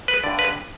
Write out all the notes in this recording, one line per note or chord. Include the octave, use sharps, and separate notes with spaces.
B4
G2 D3 D5
B4